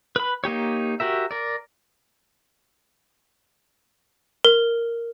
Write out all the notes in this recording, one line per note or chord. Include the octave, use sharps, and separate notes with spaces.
B4 B5
A#3 D#4 G4 C#5
F#4 G4 A#4 E5
A#4 D5
A#4